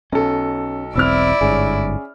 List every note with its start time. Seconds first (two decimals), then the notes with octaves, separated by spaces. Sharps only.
0.13 B1 C#4 A4
0.96 E1 B1 C4 E4 D5 E6 F6
1.41 G1 G#2 C#4 G#4